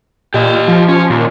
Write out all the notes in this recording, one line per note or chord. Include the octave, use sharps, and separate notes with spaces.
A#2 G4 D#5
F3
C#4
D#2 A#2